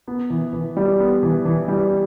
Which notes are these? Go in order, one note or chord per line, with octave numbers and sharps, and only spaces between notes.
B3
E3
E3
G3
B3
E3
E3
G3